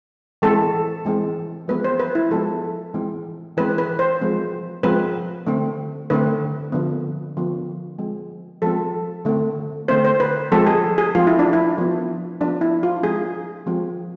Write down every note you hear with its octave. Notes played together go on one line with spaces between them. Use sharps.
E3 G#3 C4 A4
E3 G#3 C4
F3 G#3 B3 B4
C5
B4
E4
F3 G#3 B3 A4
E3 G#3 C4
E3 G#3 C4 B4
B4
C5
F3 G#3 C4
F3 G#3 C4 B4
D3 A3 C4
D3 A3 C4 B4
D3 F3 B3
D3 F3 B3
F3 G#3 C4
F3 G#3 C4 A4
D3 A3 C4
D3 A3 C4 C5
C5
B4
F3 G#3 C4 A4
G#4
G#4
F3 G#3 C4 F4
E4
D4
E4
F3 B3
F3 B3 D4
E4
F4
F3 G#3 C4 G#4
F3 G#3 C4